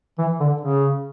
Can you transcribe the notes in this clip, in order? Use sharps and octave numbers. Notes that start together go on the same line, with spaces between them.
E3
D3
C#3